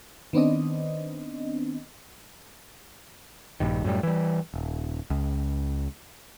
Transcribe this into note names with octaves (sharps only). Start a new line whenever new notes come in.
D#3 B3 C4 D4 D#5
A#1 G2 D#3
F#2 A2 F#3 G3
E3 G3
D#1
C#2